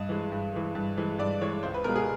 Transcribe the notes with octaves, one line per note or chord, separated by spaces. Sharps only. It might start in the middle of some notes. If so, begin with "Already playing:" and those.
Already playing: G2 D#5
E3 G#3
G2
E3 G#3
G2
E3 G#3
G2 D5
E3 G#3 C#5
C#2 C5
B4
B2 G#3 A#4
G#4